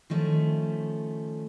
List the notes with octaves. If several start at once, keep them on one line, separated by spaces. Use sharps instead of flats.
D#3 F3 A3 C#4